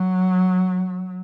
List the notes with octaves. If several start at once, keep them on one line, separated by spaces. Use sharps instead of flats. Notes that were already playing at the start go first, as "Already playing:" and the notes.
Already playing: F#3